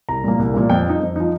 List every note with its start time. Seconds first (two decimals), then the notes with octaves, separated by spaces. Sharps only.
0.09 C2 A#5
0.24 A#2 F3 A#3
0.39 C2
0.54 A#2 F3 A#3
0.69 F2 G5
0.86 F3 D#4
1.00 F2
1.16 F3 D#4